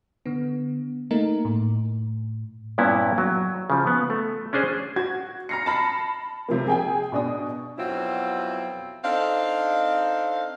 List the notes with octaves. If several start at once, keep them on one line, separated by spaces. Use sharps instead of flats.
D3 B3
A3 A#3 D#4 A#4
A2
G2 A#2 B3 C#4 E4
F#3
C#3 F3
B3
A3
C#4 D4 G#4 C5
F#4 G#6
A#5 F6 A#6 C7 C#7
A5 B5 A#6 C7 C#7
C3 F3 A#3
G#4 G5 G#5
B2 D4 D#6
F2 B2 F#3 C4 E4 F4
C4 D4 D#4 A4 F5